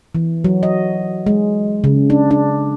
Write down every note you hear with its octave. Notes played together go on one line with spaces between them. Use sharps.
E3
F#3
D#5
G#3
C#3
D4
D4